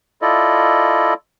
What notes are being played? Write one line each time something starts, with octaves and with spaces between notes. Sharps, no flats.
E4 F4 A4 D5 D#5